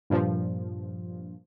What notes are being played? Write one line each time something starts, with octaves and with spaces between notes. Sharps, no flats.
G2 A#2 F3